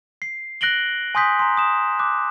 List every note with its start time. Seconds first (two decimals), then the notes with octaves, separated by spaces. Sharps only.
0.22 C7
0.61 F#6 A#6 D7 F#7 G7
1.15 G#5 C6 D#6 G6 B6
1.39 A#5 C6
1.57 D#6 E7
1.99 D6 F#6